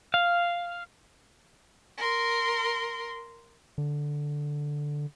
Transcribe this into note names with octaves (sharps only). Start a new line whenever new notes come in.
F5
A#4 C6
D3